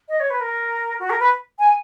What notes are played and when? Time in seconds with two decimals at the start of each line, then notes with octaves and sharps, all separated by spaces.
0.08 D#5
0.19 C#5
0.30 B4
0.40 A#4
0.99 F#4
1.09 A#4
1.19 B4
1.59 G#5